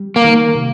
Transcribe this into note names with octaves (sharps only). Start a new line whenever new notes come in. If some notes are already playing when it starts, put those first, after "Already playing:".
Already playing: G3
A#3
D#3
C3